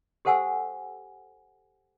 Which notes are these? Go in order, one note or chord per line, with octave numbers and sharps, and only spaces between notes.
G4 A4 C5 F#5 G#5 E6